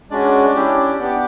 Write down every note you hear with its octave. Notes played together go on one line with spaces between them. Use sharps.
G#3 C#4 D4 F#4 D5
C#4 E4 G4
B3 D4 G4